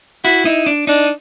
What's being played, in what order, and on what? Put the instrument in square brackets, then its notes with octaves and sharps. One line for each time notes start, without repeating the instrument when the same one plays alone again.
[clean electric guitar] E4 [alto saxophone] F#4
[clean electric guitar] D#4 [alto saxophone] E4
[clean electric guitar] D4
[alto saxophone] D4 [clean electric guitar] D#4